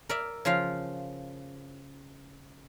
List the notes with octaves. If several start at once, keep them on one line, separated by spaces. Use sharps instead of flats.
A#4 D5 E5
C#3 F3 F4 F5